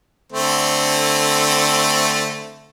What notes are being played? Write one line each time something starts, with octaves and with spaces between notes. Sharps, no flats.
D3 A3 C4